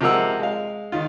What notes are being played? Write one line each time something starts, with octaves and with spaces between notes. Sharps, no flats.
C3 F3 G#3 A#4 F#5 E6
G#3 F5
D#3 F4